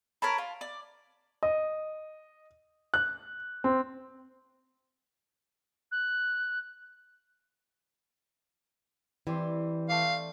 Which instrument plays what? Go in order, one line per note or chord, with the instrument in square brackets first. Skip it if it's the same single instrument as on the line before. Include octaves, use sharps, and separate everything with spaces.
[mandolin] A#4 C#5 A5 B5
F4
D5
[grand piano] D#5
F#6
C4
[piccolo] F#6
[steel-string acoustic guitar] E3 [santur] G3 C4 C6
[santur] A3 D5 [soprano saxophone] F5